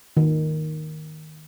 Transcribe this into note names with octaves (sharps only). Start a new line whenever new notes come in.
D#3